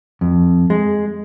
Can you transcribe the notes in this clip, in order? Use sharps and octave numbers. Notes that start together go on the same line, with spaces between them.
F2
G#3